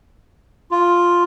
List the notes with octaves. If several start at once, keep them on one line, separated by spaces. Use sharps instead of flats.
F4